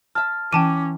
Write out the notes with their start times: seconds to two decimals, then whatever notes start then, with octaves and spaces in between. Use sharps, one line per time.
0.15 E5 A5 F6
0.53 E3 C#4 G5 A5 D6 D#7